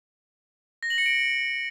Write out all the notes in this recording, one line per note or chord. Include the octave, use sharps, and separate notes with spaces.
A#6
F#7
C#7
D7